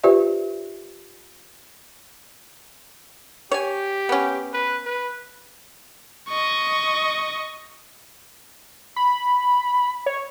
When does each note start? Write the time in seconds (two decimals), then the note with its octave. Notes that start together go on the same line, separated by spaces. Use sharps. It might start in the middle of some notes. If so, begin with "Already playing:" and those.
0.04 F4 G4 B4 C5 D5 E5
3.52 G4 C#5 G#5
4.09 B3 C#4
4.53 B4
4.85 B4
6.29 D#5 C#6
8.96 B5
10.06 C#5